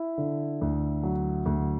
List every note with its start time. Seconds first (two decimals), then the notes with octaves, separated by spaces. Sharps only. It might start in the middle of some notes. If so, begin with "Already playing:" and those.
Already playing: E4
0.18 D3
0.61 D2
1.03 F#3
1.46 D2